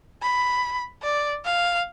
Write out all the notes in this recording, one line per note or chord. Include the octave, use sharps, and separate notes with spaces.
B5
D5
F5